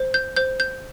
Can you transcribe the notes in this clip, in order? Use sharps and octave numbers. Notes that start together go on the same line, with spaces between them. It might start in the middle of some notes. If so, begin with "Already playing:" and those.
Already playing: C5
G6
C5 G6
G6